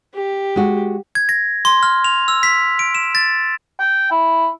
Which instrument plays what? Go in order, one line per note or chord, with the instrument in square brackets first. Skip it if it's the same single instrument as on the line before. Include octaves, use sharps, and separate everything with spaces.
[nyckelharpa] G4
[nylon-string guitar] G#3 F#4
[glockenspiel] G#6
A#6
C6
F6
F7
E6
B6
D7
E7
A6
[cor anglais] G5
E4